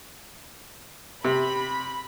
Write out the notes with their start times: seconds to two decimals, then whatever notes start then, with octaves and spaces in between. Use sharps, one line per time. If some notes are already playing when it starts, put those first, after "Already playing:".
1.25 C3 B5